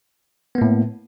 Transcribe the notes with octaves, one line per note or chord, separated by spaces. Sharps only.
A2 A#3 B3